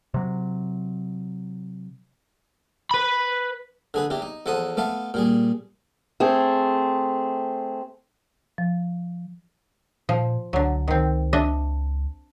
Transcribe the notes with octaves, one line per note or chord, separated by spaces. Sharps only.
C3 F#3
B4 B5
D3 G#4 B4
E2 E3 G4
D#4
E2 F3 A4 F#5 D#6
A3 B3 A4 F5
A#2 G3 G#4
A3 C4 G#4
F3
A#2 F3
C#2 D3 F#3
C#2 D#3 C4
D4 D#5 E5